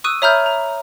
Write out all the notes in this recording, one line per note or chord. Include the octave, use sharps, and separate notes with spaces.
C#6 D#6 E6 F#6 D#7
C#5 E5 A#5 B5 F6 G6
A#5